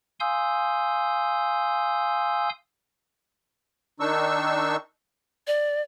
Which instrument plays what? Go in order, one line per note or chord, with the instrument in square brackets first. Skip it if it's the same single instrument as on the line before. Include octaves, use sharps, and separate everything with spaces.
[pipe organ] F5 G#5 C6 D#6 E6 G6
[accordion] D#3 D4 D#4 C#6 E6
[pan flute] D5